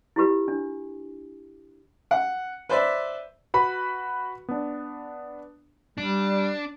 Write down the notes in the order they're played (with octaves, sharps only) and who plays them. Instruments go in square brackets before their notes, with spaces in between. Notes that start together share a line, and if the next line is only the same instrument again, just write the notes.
[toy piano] E4 F4 G4 B4
D4
[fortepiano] F#5
B4 C5 D5 E5
[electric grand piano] F#4 B4 B5
B3 D4
[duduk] G3 [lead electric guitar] D4